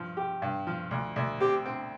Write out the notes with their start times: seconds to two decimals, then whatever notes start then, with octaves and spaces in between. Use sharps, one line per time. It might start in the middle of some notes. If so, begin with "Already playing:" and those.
Already playing: G2 F3
0.17 G4
0.42 G2
0.67 F3
0.91 D2
1.16 D2
1.40 C4 G4
1.66 C4